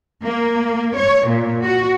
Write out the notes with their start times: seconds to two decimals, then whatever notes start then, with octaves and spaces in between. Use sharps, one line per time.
0.24 A#3
0.97 C#5
1.26 A#2
1.64 F#4